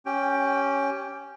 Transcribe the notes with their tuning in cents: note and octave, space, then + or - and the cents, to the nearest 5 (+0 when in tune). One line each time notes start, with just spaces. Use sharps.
C#4 +0 G4 -15 G5 +10